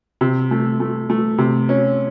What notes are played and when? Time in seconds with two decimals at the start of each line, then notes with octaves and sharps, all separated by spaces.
0.21 C3
0.51 A3
0.80 A3
1.10 A3
1.38 C3
1.69 C#4